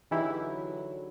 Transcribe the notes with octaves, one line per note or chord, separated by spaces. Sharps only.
D3 E3 F#3 D#4 E4 G4 G#4